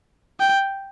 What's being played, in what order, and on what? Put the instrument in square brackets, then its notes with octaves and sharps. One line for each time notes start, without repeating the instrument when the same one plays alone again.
[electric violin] G5